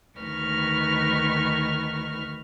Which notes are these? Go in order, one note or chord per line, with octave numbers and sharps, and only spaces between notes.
D2 D#3 B4 C#6 F6 A#6